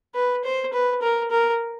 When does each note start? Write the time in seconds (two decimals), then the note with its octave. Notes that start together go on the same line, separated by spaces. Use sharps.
0.15 B4
0.44 C5
0.73 B4
1.02 A#4
1.31 A#4